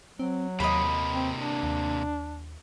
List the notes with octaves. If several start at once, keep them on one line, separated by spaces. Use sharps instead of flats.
F#3 C4
D#2 C3 A#3 D#5 B5
C4
D4
D#2